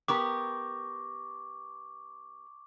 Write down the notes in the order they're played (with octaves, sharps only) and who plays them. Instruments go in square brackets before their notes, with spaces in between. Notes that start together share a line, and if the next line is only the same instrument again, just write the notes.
[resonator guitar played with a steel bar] B3 G4 A#4 [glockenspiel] C#6 D6